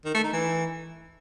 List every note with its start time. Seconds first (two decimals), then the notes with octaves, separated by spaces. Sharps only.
0.05 D#3
0.14 A3
0.24 D#4
0.33 E3